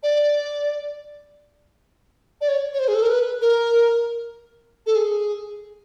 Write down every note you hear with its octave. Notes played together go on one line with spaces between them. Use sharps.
D5
D5
C#5
C#5
C5
G#4
A4
A#4
B4
A#4
A4
G#4